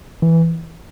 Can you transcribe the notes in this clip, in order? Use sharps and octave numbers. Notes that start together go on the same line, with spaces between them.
E3